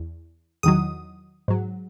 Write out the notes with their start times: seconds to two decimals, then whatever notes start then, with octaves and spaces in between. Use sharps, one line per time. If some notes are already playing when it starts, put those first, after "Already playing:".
Already playing: E2
0.63 E2 D#3 F#3 D#6
1.48 G#2 F#3